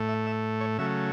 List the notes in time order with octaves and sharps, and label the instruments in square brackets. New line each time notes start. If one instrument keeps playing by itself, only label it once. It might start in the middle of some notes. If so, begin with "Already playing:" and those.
Already playing: [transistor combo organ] A2 A3
E5
E5
C#5
C#3 F#3 A3 E5